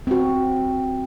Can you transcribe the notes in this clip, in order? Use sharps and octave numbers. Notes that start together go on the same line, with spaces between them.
C4 F#4